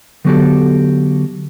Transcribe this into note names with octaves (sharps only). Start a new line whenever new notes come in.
D3 F#3 B3 F#4 G4 A4